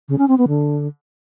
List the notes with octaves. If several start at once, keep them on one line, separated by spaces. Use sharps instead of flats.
C#3
C#4
C4
B3
D3